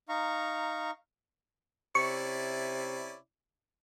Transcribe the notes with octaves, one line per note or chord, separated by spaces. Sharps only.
D#4 F5 A#5 C#6
C3 C#4 E4 D5 C#6